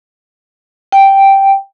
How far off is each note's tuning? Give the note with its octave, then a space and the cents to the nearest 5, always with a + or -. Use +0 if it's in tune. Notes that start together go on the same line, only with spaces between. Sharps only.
G5 -5